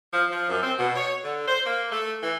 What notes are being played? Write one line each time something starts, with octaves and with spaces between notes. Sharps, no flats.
F3
F3
F#2
C4
B2
C#5
D3
C5
A#3
A3
E3